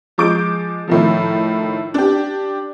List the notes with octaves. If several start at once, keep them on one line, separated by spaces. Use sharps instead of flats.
F3 G#3 D6 G6 D7
A2 D#3 F3
D4 G4